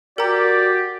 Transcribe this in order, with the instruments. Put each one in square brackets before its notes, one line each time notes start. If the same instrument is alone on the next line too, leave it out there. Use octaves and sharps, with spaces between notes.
[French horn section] F#4 [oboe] G4 [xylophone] A#4 G5 A#5 [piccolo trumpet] D5